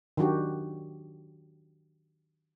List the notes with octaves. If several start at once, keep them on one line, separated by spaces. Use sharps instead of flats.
D#3 F#3 D4 F#4 G4